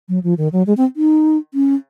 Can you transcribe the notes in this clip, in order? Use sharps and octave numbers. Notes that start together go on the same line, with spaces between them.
F#3
F3
D#3
F#3
G#3
C4
D#4
C#4